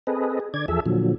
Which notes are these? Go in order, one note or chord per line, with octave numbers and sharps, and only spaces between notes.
C4 G#4 A4 B4 D#5
G#4
D3 D5 G#6
E2 F3 G#4 A4 E5
A#2 D3 F3 F#3